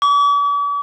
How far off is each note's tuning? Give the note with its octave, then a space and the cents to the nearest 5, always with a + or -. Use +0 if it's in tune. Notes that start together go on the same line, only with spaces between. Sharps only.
D6 -45